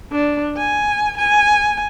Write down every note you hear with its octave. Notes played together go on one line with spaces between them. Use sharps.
D4
G#5
G#5